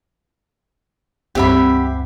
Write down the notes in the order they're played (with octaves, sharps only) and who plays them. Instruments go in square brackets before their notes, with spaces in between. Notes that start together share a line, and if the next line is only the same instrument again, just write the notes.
[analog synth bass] C#2 [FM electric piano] G2 C4 F#5 [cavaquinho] G4 E5 B5